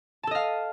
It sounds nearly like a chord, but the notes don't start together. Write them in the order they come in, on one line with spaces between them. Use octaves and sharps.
A5 A4 D#5 F5